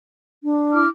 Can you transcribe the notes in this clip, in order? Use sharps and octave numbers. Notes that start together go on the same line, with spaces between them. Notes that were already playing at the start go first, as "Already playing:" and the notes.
D4
E4 D6 F6